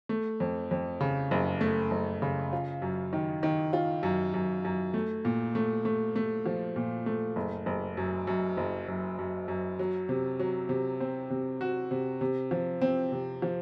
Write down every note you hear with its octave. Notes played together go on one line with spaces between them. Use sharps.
A3
F2
F2
C#3
F#1
A3
F#1
C#3
F4
F#2
D#3
D#3
F4
F#2
F#2
F#2
A3
A#2
A3
A3
A3
F3
A#2
A3
F#1
F#1
F#2
F#2
F#1
F#2
F#2
F#2
F#3
C3
F#3
C3
C4
C3
F#4
C3
C3
F3
C4
C3
F3